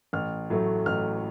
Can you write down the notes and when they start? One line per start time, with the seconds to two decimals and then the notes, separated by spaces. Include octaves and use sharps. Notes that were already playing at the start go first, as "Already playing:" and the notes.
0.13 A1 F6
0.50 A2 F#3 A3
0.86 A1 F6